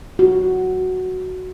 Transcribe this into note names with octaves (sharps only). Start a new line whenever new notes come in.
F#4